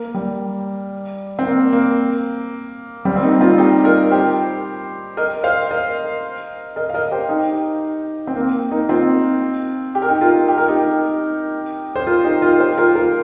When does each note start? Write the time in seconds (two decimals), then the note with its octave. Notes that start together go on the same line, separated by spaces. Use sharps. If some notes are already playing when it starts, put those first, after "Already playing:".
Already playing: A#3
0.14 G3
1.39 C4
1.47 A#3
1.73 A#3
3.05 G3 C4
3.16 C4
3.23 A#3 D#4
3.41 C4 F4
3.58 D#4 G4
3.84 F4 A#4
4.11 G4 C5
5.17 A#4 D#5
5.44 C5 F5
5.71 A#4 D#5
6.76 A#4 D#5
6.90 F5
6.94 A#4 D#5
7.11 G4 C5
7.29 D#4 G4
8.27 C4
8.36 A#3
8.71 A#3 D#4
8.89 C4 F4
9.95 G4
10.02 A#4
10.09 D#4 G4
10.21 F4 A#4
10.48 G4
10.58 A#4
10.68 D#4 G4
11.96 C5
12.07 F4 A#4
12.24 D#4 G4
12.42 F4 A#4
12.54 A#4
12.60 G4 C5
12.78 F4 A#4
12.95 F4 A#4